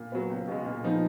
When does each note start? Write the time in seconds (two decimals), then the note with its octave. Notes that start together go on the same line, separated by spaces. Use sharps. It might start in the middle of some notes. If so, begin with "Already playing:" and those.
Already playing: A#2
0.12 F#3 B3
0.30 C#2
0.48 B2 G#3
0.65 A#2
0.84 F3 B3 D#4